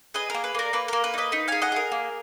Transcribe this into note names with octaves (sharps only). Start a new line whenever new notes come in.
G#4 B4 D#5
A#3 A#4
B4
A#3 A#4 D5
A#3 B4
A#3 A#4
B4
D#4
B4 D#5
D#4 B4
G#4 F5 G#5
D#5 F#5
G#4 A#4
A#3